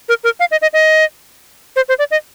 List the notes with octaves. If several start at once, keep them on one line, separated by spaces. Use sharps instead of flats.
A#4
A#4
F5
D#5
D#5
D#5
C5
C5
D5
D#5